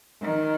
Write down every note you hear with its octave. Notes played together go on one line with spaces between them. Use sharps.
D#3